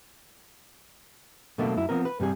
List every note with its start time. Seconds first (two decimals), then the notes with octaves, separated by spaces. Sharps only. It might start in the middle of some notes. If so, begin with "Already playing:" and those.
1.58 B2 F#3 A3 A#3 D4
1.76 F#2 E4
1.89 F3 B3 C4 A#4
2.05 B4
2.20 G2 C3 G3 G#4